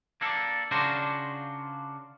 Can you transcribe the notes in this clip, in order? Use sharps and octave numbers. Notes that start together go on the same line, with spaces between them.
A#3 D4 A4
C#3 D4 F4 F#4 A#4 C5